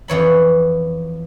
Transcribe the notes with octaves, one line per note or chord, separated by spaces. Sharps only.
F2 E3 C#5 B5